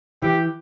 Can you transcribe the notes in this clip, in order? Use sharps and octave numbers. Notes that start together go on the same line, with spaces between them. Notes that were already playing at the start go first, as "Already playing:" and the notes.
E3 G4